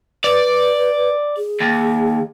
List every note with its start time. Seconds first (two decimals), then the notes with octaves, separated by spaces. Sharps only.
0.24 B4 D5
1.37 G#4
1.60 D#2